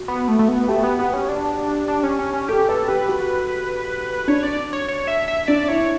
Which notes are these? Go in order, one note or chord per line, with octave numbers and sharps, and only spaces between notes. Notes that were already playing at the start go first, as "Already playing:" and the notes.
Already playing: F#4
B3
A3
A3
B3
A3 G4
B3
B3 G4
C#4
D4
D4
C#4
C#4
C#4
G4 A4
A4 B4
G4 B4
F#4
D4 C#5
D5
C#5
C#5
E5
E5
D4 D5
E4 C#5